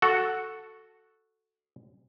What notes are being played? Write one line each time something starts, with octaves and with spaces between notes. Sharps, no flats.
F#4 A4